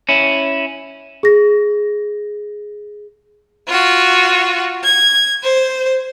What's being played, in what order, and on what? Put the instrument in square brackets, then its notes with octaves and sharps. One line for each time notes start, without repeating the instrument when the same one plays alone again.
[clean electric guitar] C#4 E4
[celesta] G#4 A#6
[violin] F4 F#4
G#6
C5